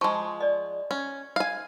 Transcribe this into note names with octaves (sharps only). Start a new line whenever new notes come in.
F3 G#3 F4 A5 C#6
D5 D#5
C#4
F5 G#5